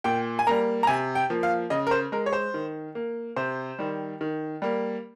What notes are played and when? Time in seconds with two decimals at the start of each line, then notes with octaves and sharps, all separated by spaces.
0.04 A#2 G5
0.39 G#5
0.47 G3 A#3 A#5
0.83 A#5
0.87 C3 G#5
1.15 G5
1.30 F3 A#3
1.43 F5
1.70 C#3 D#5
1.87 A#4
1.91 C5
2.12 G#3 A#4
2.26 C#5
2.33 C5
2.54 D#3
2.95 A#3
3.36 C3 C5
3.79 D#3 G3
4.21 D#3
4.62 G3 A#3